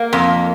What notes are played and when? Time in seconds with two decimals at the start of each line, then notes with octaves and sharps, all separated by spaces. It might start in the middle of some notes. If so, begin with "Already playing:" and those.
Already playing: A#3
0.13 F2